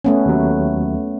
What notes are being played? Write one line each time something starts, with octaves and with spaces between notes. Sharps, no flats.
A3 B3 C#4
D#2 F#3